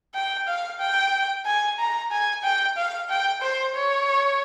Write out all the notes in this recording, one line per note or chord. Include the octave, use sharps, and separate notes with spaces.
G5
F5
G5
G#5
A#5
G#5
G5
F5
G5
C5
C#5